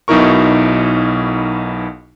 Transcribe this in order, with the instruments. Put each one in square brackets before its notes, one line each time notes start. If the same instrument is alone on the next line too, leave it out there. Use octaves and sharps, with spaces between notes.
[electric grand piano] B1 B2 D#4 E4 A#4 C#6